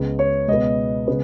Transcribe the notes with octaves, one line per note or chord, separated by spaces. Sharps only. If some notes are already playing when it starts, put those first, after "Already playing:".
Already playing: C#2 C#3 G#3 B3
C#5
C#2 B2 B3 D#5
C#3 G#3 B3